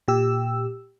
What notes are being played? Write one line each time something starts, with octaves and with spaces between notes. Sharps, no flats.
A#2 G4 E6